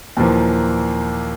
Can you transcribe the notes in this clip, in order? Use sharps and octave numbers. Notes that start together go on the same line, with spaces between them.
D#2 A#2 E3 F3 A#3